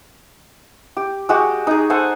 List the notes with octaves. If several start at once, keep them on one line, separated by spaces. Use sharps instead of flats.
G4
G#3 F#4 G4
D#4 G#4
A4 C5 F#5 G#5